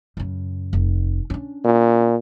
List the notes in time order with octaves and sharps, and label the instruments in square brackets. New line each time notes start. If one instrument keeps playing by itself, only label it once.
[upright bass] F#2 C#3
F1
C#4 D4
[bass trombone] A#2